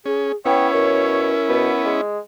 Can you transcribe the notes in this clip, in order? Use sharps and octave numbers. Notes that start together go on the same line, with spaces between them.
C#4 G#4
B3 C#4 E4 C#5 G5
B2 A#4
B2 B3
G#3